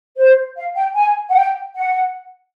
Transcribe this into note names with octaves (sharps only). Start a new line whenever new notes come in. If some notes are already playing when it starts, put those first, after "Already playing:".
C5
F5
G5
G#5
F#5
G5
F#5